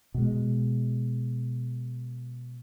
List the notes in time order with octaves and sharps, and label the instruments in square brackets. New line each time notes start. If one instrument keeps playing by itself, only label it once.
[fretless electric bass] B2 G#3